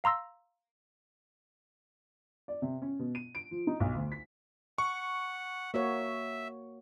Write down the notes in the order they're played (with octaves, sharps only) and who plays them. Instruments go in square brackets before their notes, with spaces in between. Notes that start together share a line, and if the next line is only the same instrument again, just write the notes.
[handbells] F5 A#5 C6 E6 A#6
[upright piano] D5
C3
C#4
B2
D#7
D7
F3
D#4
B1
D2
B6
[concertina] F#5 [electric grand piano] C#6
[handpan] A#3 F#4 C#5 [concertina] E5